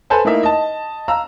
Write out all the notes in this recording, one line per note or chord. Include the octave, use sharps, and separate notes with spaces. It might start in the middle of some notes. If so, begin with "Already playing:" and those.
A4 B4 C5 G#5 A5
A3 A#3 D#4 E4 E5
D#5 A5
F5 A#5 E6